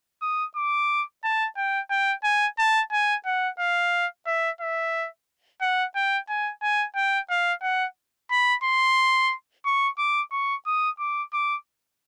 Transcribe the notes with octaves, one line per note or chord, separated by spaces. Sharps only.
D#6
D6
A5
G5
G5
G#5
A5
G#5
F#5
F5
E5
E5
F#5
G5
G#5
G#5
G5
F5
F#5
B5
C6
C#6
D6
C#6
D#6
D6
D6